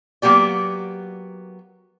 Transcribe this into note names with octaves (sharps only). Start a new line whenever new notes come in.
F#3 A#3 B3 G4 D5